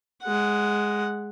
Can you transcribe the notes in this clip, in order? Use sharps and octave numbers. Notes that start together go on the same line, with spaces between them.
G#3 F#5